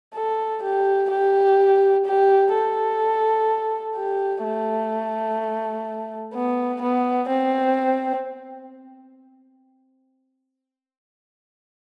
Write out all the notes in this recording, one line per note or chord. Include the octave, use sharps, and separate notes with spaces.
A4
G4
G4
G4
A4
G4
A3
B3
B3
C4